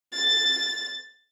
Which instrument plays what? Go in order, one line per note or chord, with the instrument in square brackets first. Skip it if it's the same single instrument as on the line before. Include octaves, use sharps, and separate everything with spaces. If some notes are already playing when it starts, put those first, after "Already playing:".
[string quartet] A6